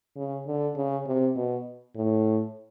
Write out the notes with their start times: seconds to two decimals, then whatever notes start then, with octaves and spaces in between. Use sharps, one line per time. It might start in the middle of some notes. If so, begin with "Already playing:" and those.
0.16 C#3
0.46 D3
0.76 C#3
1.06 C3
1.36 B2
1.95 A2